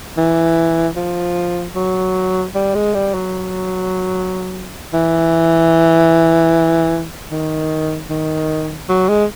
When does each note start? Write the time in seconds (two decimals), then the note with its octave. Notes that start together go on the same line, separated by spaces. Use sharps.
0.17 E3
0.96 F3
1.75 F#3
2.55 G3
2.75 G#3
2.94 G3
3.14 F#3
4.93 E3
7.31 D#3
8.10 D#3
8.89 F#3
9.09 G#3